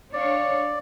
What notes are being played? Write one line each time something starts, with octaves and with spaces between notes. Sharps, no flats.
D4 C#5 D5 F5